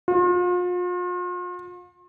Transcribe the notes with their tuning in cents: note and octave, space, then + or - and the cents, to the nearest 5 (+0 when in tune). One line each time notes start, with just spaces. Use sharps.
F4 +40